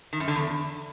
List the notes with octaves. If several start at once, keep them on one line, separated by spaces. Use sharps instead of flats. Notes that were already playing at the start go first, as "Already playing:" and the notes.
D#3
F#2
D3
E2